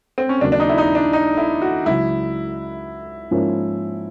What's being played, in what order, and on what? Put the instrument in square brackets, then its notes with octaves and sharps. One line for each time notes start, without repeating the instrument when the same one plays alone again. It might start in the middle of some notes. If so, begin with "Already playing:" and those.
[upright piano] C4
C#4
[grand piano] D#2 C#3 F#3 A#3 [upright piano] D4
[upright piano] D4
D#4
E4
D#4
D4
D#4
E4
F#4
[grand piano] C#2 C#3 F#3 [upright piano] E4
[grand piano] G#2 F3 A#3 C#4 E4